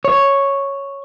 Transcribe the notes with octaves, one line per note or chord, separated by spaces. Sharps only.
C#5